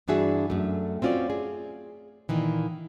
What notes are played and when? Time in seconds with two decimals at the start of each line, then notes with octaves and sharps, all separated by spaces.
0.08 G2 E3 D4 F#4 G#4 E5
0.50 F#2 A3
1.02 C4 C#4 F4 F#4 D5
1.30 G#4
2.29 A#2 D#3 E3